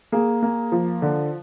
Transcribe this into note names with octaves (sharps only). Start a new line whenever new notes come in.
A#3 G#4
A#3
F3
D3